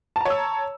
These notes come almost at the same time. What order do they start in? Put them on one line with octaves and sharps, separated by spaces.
A5 A#5 C#5 E6